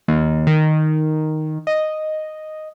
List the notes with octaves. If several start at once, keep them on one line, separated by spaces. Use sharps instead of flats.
D#2
D#3
D#5